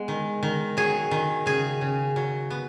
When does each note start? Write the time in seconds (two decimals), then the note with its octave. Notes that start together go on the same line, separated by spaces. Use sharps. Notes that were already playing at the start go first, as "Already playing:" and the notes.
Already playing: G#3 B3
0.08 D#3
0.43 D#3
0.77 F#3 G#4
1.11 D#3
1.46 C#3 G#4
1.81 C#3
2.16 F#3
2.50 B3